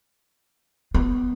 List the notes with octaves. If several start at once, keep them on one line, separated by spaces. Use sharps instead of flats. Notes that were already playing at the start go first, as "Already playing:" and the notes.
B3